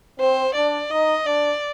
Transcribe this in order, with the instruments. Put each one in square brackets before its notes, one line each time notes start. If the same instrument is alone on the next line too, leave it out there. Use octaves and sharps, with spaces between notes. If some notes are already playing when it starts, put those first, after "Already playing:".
[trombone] C4 [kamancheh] C5
[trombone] D4 [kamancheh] D5
[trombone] D#4 [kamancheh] D#5
[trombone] D4 [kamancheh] D5